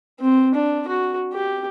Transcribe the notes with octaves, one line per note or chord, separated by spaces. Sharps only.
C4
D4
F#4
G4